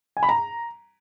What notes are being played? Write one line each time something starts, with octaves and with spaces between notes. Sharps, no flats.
G#5
B5
A#5